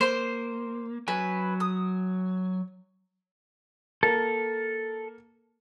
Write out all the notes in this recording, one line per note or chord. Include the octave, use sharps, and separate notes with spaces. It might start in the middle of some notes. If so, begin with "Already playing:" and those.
A#3 C5 C6
F#3 B4 G#5
D#6
A#3 A4 A#4